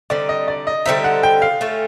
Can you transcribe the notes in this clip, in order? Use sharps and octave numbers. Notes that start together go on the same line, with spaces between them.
D3 G3 C4 D#4 D5
D#5
D5
D#5
D3 G3 C4 D#4 E5
F#5
G5
F5
A3 C#4 F4